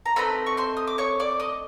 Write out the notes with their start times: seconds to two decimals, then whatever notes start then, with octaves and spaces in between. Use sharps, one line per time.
0.06 A#5
0.16 A3 C4 D#4 B4 B5
0.46 C#6
0.57 C5 C6
0.77 D#6
0.87 D6
0.98 C#5 C#6
1.20 D5 D6
1.40 D#5 D#6